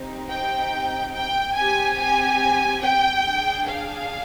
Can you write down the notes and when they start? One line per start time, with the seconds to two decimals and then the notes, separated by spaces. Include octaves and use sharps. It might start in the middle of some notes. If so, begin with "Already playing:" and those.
Already playing: C4 D#4 G4
0.28 G5
1.13 G5
1.55 C4 G4 G#5
1.97 G#5
2.81 G5
3.24 D4 G#4
3.67 F5